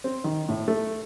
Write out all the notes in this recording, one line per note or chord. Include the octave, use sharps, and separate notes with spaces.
C4
D#3
A2
A3